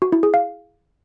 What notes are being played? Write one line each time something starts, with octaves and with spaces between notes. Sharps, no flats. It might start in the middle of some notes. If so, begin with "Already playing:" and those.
F#4
E4
G#4
F5